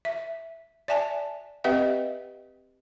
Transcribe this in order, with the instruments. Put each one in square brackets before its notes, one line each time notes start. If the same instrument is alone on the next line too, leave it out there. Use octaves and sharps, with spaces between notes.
[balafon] E5
D5 E5 G#5 A5
C4 G4 B4 D#5 E5 F#5